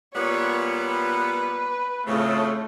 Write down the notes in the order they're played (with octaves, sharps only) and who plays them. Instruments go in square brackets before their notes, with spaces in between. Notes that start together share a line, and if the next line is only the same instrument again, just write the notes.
[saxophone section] A#2 G3 B3 [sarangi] C#5
[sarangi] B4
[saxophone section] F2 A2 C#3 [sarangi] A3